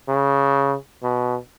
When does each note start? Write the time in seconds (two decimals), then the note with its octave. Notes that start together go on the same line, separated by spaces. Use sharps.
0.08 C#3
1.03 B2